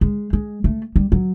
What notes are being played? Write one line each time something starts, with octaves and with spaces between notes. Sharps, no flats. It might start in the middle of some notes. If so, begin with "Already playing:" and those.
G#3
G#3
A3
G3
F#3